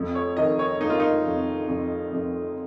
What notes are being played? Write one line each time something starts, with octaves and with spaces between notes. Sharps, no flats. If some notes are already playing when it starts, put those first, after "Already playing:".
Already playing: F2
C#5
D#3 D#5
C#5
A#3 D#4
F4
D#4
F2
F2
F2